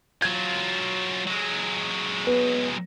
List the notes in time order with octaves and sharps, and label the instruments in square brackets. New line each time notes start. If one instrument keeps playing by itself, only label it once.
[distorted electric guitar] F#3 F4 [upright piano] G#6
[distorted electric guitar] F#3 G#3
[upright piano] B3 B4